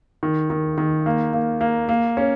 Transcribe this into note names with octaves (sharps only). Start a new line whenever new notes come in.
D#3
D#3
D#3
A#3
A#3
A#3
A#3
C#4